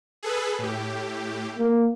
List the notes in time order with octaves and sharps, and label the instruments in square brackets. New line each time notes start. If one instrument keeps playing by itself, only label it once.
[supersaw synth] G#4 A4 B4
A2 G4
[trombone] A#3